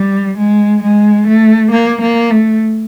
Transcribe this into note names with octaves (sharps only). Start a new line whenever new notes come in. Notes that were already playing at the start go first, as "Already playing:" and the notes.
Already playing: G3
G#3
G#3
A3
A#3
A#3
A3